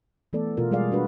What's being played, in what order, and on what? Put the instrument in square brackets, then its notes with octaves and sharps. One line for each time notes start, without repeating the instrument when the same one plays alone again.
[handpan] E3 A3 B3 A4 D5
B2 F4 A#4
G3 G#3 G#4 A#4 D5 F5
D4 F#4 B4